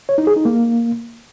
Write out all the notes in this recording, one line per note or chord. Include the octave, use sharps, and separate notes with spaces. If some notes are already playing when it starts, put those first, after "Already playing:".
C#5
D#4
G#4
D#4
A#3